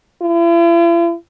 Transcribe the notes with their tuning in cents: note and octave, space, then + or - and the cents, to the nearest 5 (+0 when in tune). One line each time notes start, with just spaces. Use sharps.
E4 +45